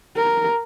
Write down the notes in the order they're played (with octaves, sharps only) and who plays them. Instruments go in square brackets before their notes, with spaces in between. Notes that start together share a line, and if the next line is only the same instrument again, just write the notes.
[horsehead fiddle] A#4